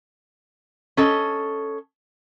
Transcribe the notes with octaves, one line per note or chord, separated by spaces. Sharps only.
C#4 A4 D#5